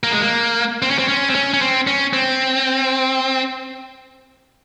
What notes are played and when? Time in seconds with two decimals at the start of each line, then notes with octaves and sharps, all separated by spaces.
0.04 A#3
0.12 G#3
0.21 A#3
0.82 C4
0.90 C#4
0.99 C4
1.09 C#4
1.30 C4
1.35 C#4
1.54 C#4
1.62 C4
1.87 C#4
2.13 C4